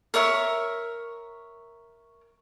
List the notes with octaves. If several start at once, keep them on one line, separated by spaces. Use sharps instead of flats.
A#4 C#5 E5 C#6